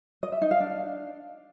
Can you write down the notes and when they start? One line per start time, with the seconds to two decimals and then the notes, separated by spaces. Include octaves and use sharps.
0.23 D#5
0.32 E5
0.42 D#4
0.51 F5
0.60 D4